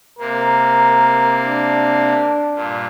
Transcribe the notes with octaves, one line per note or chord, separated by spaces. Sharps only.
C3 A#3 A#4
D4
G2 A#2